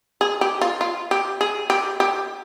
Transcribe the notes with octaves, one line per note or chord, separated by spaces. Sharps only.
G#4
G4
F4
F4
G4
G#4
G4
G4